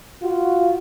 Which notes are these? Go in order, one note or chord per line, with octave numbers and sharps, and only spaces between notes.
F4 F#4